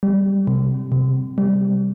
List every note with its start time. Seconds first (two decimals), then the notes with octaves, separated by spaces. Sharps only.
0.03 G3
0.47 C3
0.92 C3
1.38 G3